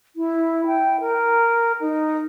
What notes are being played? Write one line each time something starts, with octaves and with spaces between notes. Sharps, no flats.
E4
G5
A#4
D#4